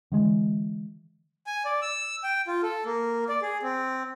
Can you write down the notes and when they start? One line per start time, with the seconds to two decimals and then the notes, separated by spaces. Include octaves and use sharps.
0.12 D3 E3 G#3
1.47 G#5
1.65 D5
1.82 E6
2.23 G5
2.47 F4
2.63 A4
2.85 A#3
3.29 D5
3.42 G#4
3.63 C4